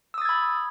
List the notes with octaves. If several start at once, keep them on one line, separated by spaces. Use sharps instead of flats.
B5 D#6 E6 G#6 A6